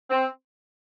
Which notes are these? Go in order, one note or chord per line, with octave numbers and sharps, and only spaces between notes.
C4